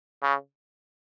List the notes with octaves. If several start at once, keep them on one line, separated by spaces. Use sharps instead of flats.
C#3